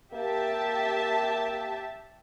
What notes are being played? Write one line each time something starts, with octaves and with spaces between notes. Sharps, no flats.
A#3 G4 E5 A5